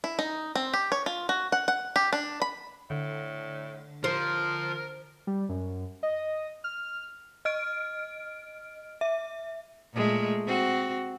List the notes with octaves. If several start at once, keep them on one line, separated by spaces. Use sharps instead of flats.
E4
D#4
C4
G4
C#5
F4
F#4
F#5
F#5
G4
D4
B5
A2 D3
F3 A#4 C5
G3
F#2
D#5
F6
D#5 F6 D7
E5
A#2 G#3 A3
C4 F#4